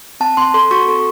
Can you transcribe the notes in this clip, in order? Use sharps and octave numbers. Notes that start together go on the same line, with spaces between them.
C4 A5
C4 C6
A4 C6
F#4 C#6
A4